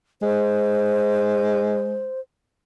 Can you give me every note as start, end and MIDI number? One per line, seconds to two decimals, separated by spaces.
0.22 2.08 56
0.22 2.20 72